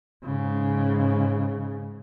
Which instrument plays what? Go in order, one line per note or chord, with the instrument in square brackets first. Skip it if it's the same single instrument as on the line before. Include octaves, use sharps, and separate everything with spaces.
[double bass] G#2 C#3